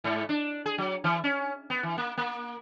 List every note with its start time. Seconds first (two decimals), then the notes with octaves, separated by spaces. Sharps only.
0.04 G#2
0.29 D4
0.66 G#4
0.78 F#3
1.04 E3
1.24 C#4
1.70 B3
1.83 E3
1.98 A#3
2.17 A#3